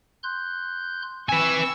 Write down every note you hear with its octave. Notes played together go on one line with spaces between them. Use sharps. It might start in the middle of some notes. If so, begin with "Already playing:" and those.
C6 F#6 G6
C4 B4 G#5 C#6 E6